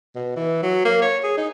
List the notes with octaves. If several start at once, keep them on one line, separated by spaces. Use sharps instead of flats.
B2
E3
F#3
A#3
C#5
G#4
D#4